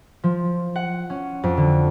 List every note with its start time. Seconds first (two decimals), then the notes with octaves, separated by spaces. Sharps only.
0.24 F3
0.76 F#5
1.10 C#4
1.43 F2
1.57 D3